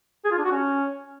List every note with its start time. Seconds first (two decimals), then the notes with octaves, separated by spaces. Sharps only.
0.25 G#4
0.31 F4
0.38 D4
0.45 F#4
0.51 C#4